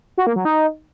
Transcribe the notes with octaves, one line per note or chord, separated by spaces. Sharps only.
F#4
A#3
F#3
D#4